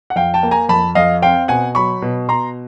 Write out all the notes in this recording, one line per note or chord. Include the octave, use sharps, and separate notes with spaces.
F#5
F2 F5 G5
G5 A5
A#3
G#5 A#5
F2 A5 B5
F2 D#5 F5
C4 F5 G5
B2 F#5 G#5
F#3 B5 C#6
B2
B2 A#5 C6